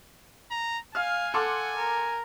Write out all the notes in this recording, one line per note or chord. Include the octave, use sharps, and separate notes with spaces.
A#5
F5 G#5 F6
A4 F#5 C6 D6
A#4